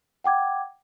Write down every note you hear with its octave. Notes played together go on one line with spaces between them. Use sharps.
F#5 G5 D6 G#6